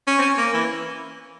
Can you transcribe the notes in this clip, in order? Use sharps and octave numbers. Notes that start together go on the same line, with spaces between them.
C#4
C4
C#4
A#3
E3